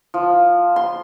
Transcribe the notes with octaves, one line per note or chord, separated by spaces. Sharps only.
F3
C6